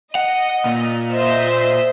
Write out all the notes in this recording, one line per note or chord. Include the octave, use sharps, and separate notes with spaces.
D#5 F#5
A#2
C5 D#5 E5